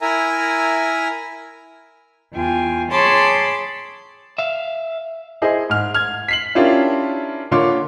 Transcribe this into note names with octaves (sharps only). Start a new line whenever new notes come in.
E4 A#4 E5 G#5 A#5
E2 F4 G5 G#5
G#4 C#5 A5 B5 C6 D6
E5 F5
E4 G#4 C5 D#5
G#2 F6
F6 G#6
B6 C7 F#7
C#4 D4 E4 F4 G4 A#4
D3 A#3 F4 C#5 C6 D6